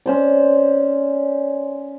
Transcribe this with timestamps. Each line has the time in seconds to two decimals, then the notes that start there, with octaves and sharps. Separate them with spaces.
0.06 C#4 C5 D5